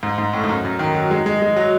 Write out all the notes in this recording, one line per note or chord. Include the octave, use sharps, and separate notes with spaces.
G#2
G#2
A2
G#2
F#2
F#2
D#3
F#3
G#3
G#3
G#3
F#3